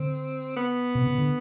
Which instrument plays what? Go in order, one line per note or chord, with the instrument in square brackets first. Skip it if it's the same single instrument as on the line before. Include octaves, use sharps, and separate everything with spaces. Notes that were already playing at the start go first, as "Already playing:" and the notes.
Already playing: [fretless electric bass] D3 [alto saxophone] C4
[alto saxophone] B3
[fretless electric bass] C3
C#3
D3